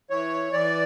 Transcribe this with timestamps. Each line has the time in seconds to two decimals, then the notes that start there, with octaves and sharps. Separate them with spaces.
0.10 E3 C#5
0.53 E3 D5